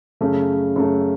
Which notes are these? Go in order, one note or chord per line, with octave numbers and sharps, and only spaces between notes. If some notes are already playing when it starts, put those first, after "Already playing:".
F#2 C#3 A3
F#2 C#3 A3